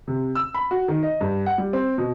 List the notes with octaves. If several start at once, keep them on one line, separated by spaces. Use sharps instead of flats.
C3
E6
B5
F#4
D#3
D#5
G2
F#5
G3
C4
B2